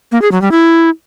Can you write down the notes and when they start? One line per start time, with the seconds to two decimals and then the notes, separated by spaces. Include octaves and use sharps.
0.12 A#3
0.22 G#4
0.32 F#3
0.42 G3
0.52 E4